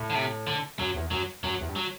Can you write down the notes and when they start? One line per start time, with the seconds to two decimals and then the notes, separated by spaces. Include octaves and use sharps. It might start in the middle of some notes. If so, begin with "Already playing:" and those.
Already playing: A2
0.10 D3
0.15 C3
0.47 D3
0.79 F#2 F#3
0.95 E2
1.11 F#2 F#3
1.43 F#2 F#3
1.60 E2
1.69 G2
1.76 F#3